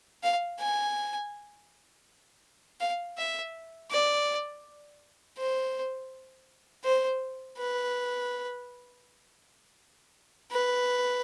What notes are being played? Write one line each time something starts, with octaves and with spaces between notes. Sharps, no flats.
F5
G#5
F5
E5
D5
C5
C5
B4
B4